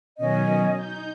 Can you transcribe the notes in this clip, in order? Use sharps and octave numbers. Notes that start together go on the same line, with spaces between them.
B2 D#3 F#3 C#4 D#5
D#4 G6